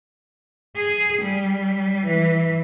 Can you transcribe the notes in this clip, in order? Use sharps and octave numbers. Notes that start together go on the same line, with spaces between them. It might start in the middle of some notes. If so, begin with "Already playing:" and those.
G#4
G3
E3